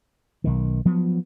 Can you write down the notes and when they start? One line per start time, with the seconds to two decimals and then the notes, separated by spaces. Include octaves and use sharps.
0.44 B1 D#3
0.85 F3 F#3 B3